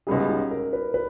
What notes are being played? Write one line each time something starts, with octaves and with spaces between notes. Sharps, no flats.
C#2 B2 G3 C#4 D#4 G#4
D#4
A#4
B4
B4